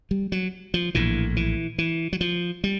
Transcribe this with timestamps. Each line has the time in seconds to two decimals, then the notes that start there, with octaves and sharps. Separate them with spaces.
0.11 G3
0.32 F#3
0.74 F3
0.95 A#1 A2 E3
1.36 E3
1.78 E3
2.13 F#3
2.21 F3
2.64 G3